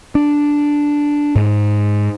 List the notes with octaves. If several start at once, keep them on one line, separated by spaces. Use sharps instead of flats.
D4
G#2